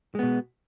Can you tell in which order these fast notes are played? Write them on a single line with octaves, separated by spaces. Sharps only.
G#3 B3 B2